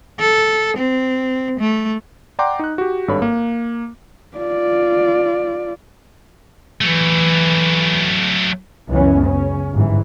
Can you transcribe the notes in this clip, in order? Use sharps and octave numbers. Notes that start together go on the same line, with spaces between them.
A4
C4
A3
D5 F#5 G5 A#5 C6 D6
D#4 F#6
F#4 G4
G#1 G2 A4 C#5 B5
A#3
F4 D5
E3 F#3 A3
C#2 F#2 E3 B3 C#4
C#3 C#4
G1 G#2 E3